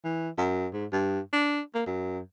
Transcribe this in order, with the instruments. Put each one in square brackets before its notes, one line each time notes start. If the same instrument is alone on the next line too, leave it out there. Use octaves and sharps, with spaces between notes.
[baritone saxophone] E3
F#2
G#2
G2
D4
A#3
F#2